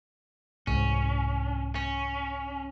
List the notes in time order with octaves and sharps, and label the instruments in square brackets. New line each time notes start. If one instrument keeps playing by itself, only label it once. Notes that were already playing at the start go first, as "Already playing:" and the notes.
[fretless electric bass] C2 G#2 [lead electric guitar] C#4
[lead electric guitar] C#4